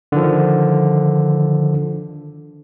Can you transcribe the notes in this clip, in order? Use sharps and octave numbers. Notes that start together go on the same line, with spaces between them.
D3 D#3 F3